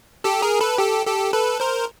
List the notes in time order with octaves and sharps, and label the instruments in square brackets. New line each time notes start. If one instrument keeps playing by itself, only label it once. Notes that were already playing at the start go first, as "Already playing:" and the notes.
[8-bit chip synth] G4 A4
G#4 A#4
A4 B4
G4 A4
G4 A4
A4 B4
A#4 C5